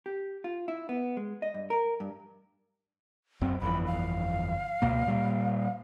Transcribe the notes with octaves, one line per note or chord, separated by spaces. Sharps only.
G4
F4
E4
B3
G#3
D#5
G2
A#4
G2
D1 F#2 C4
G1 F2 E3 B5
F5
C#2 B2 A#3
A#2 G3 A#3